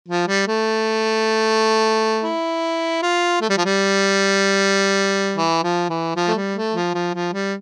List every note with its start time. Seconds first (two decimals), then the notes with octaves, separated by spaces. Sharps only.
0.08 F3
0.28 G3
0.47 A3
2.23 E4
3.02 F4
3.41 A3
3.50 G3
3.57 F3
3.65 G3
5.37 E3
5.63 F3
5.90 E3
6.16 F3
6.28 A3
6.35 G3
6.54 A3
6.74 F3
6.94 F3
7.14 F3
7.33 G3